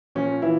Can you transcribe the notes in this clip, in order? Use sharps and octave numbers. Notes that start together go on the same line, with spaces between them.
A#2 F3 C#4
E3 E4